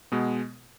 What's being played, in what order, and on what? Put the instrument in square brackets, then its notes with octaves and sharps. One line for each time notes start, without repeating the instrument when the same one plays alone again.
[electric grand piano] B2 G#3 B3